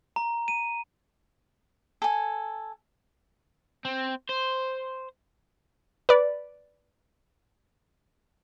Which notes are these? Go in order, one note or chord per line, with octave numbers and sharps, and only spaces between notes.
A#5
D#7
A4 G#5
C4
C5
B4 D5